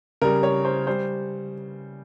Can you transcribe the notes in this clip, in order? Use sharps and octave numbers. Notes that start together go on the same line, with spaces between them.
C#3 G3 A#4
C#5
C5
G3 C5